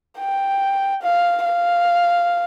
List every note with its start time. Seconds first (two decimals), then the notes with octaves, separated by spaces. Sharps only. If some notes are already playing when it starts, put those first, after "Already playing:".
0.19 G5
1.03 F5
1.45 F5